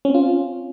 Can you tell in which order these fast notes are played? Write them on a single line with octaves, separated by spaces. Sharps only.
C#4 C4 F4